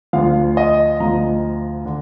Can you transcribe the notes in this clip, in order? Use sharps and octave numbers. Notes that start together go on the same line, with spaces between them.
D2 D3 F3 F5
D#5
D2 D3 F3 A#5
D3